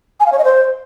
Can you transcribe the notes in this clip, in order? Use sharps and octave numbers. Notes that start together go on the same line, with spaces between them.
G#5
F5
C#5
D#5
C5